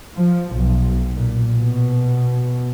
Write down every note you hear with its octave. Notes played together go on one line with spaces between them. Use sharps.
F3
B1
A#2
B2